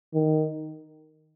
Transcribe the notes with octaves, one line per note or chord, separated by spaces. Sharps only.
D#3